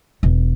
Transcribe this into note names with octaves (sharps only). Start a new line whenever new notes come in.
E1